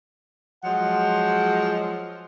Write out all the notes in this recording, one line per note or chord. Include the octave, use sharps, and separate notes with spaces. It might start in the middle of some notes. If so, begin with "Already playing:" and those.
F3 F#3 G#3 F#5